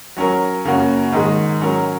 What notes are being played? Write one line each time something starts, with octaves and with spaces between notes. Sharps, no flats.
F#3 C#4 A#4
F#2 C#3 A#3 C#4 F#4
G#2 D#3 G#3
F#3 C#4 A#4